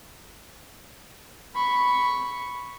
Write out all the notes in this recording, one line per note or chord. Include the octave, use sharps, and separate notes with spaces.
B5 C#6